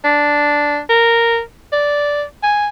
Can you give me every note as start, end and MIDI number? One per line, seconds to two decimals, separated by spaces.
0.04 0.79 62
0.90 1.40 70
1.72 2.24 74
2.43 2.69 80